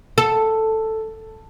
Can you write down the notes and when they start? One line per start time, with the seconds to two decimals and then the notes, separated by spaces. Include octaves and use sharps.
0.18 A4